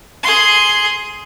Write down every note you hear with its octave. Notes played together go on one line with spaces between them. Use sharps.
G#4 C6